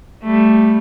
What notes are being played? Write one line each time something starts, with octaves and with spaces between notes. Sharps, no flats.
G3 A3